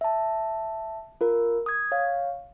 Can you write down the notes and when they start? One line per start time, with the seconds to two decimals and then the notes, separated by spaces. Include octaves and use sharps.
0.01 E5 A5
1.21 F4 A#4
1.66 D#6 G#6
1.92 C#5 F5